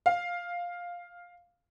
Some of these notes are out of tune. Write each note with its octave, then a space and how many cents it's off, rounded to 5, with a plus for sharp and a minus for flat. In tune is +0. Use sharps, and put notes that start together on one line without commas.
F5 +5